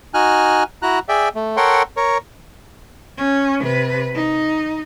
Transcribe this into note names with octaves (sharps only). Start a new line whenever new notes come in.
D#4 F#4 G#5 F6 F#6
E4 F#4 A#5 F#6
G#4 D5 E5 G5
A3
A4 A#4 C#5 F#5 G5 C6
A#4 C#5
C#4
C3 B4
D#4